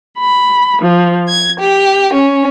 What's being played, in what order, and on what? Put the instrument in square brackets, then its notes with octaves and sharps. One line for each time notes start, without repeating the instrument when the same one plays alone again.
[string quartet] B5
F3
G#6
G4
C#4